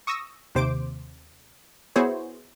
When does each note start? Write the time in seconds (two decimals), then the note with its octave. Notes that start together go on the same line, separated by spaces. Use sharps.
0.07 C#6 D#6 E6 A#6
0.55 D#2 C3 C5 D6 D7
1.96 B3 E4 F#4 G#4 C5 C#5